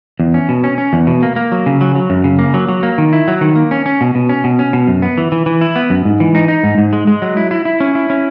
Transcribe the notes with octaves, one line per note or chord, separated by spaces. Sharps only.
E2
C#4
B2
C#4
C#4
E2
B2
A#3
A#3
F#3
C#3
F#3
F#3
F#2
C#3
A#3
F#3
F#3
A#3
D#3
E4
F#3
D#3
A#3
C#4
C#4
B2
B2
C#4
B2
C#4
B2
F#2
B3
E3
E3
E3
E4
B3
F#2
G#2
E3
D#4
D#4
G#2
G#2
G#3
G#3
F#3
E4
E4
E4
C#4
E4
C#4